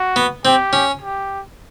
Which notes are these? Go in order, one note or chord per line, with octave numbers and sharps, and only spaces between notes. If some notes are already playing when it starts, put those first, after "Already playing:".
Already playing: F#4
B3
C4 G4
C#4
G4